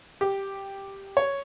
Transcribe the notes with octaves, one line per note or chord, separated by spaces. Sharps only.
G4
C#5